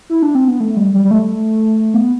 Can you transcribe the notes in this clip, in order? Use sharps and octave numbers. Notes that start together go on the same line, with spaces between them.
E4
D4
C4
B3
A3
G3
G3
G3
A3
B3